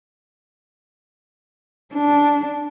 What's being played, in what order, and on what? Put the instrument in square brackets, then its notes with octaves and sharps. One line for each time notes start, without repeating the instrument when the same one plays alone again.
[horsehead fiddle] D4